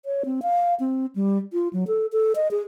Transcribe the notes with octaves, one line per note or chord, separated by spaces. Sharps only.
C#5
C4
F5
C4
G3
F4
F#3
A4
A4
D#5
G#4